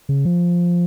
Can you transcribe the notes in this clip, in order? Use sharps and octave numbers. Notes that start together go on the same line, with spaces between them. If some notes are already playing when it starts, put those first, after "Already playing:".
C#3
F3